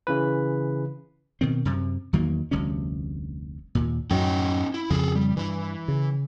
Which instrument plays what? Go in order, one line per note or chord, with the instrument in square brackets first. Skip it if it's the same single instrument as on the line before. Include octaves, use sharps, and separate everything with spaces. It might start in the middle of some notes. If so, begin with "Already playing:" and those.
[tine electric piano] C#3 E3 B4
[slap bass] B2 D#3 C4
F#2 C3
E2 D#3 F#3 A#3
F1 D2 G3 C#4
D#2 A#2
[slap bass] F#2 A2 F#3 [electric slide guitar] C#4 D#4 G5
[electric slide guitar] E4
[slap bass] F2 C#3 [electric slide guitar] G#4 A4
[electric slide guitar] G3
[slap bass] G2 [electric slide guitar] E3 E4
[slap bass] C#3